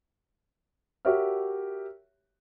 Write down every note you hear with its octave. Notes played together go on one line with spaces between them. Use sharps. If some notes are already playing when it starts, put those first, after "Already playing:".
F#4 G4 A#4 C#5 E5 F6